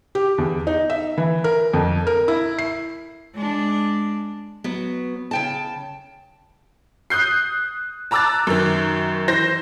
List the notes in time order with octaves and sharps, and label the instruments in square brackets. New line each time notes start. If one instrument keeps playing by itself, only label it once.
[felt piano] G4
E2
D#4
E5
E3
A#4
F2
A#4
E4
C7
[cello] G#3 D4
[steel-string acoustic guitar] F#3 B3
C#3 G5 A5
[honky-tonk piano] D#6 F#6 G6 C7
A5 A#5 D6 E6 F#6 A6
F#2 D#3
E3 C5 G6 A#6